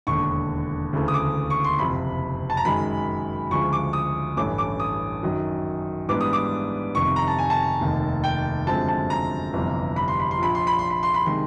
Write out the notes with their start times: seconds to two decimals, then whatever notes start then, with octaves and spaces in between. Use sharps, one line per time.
0.07 E1 D#2 D3 C#6
0.93 D2 C#3 E3 A3
1.08 D#6
1.14 D6
1.50 C#6
1.64 C6
1.79 F#1 F2 C3 B5
2.50 A5
2.57 A#5
2.65 F#2 D#3 G#3 B5
3.51 D2 C#3 F3 G#3 C#6
3.73 D6
3.93 D#6
4.37 A1 G2 E3 A3 C#4 D6
4.58 D6
4.80 D#6
5.23 F#2 D#3 F#3
6.08 G#2 E3 G3 B3 D4 D6
6.21 D#6
6.33 D6
6.95 F1 F2 C3 D#3 C#6
7.16 A#5
7.28 A5
7.38 G#5
7.50 A5
7.81 F1 D#2 D#3
8.24 G5
8.67 F#2 D3 F3 G#3 C4 A5
8.88 A5
9.10 A#5
9.53 G1 F2 C3 E3 G3
9.96 B5
10.08 C6
10.20 B5
10.31 C6
10.38 A#1 A#2 F3 B5
10.55 C6
10.67 B5
10.79 C6
10.90 B5
11.03 C6
11.14 B5
11.26 C3 D#3 G#3 C6